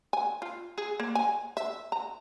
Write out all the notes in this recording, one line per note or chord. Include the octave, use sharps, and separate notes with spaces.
G#5
F4
G#4
A#3
G#5
E5
A#5